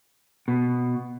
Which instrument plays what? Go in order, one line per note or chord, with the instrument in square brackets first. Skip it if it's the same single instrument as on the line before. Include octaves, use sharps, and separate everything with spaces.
[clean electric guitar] B2